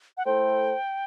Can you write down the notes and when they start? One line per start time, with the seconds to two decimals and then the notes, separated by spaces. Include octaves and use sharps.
0.17 F#5
0.25 A3 E4 A4 C5 G5